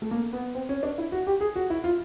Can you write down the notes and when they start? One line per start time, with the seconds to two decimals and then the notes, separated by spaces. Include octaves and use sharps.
0.02 A3
0.11 A#3
0.33 B3
0.55 C4
0.69 C#4
0.83 D4
0.98 E4
1.12 F#4
1.27 G4
1.41 G#4
1.56 F#4
1.70 E4
1.84 F4